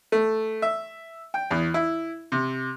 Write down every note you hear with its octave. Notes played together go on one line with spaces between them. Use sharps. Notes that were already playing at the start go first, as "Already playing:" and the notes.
A3
E5
G5
E2
E4
C3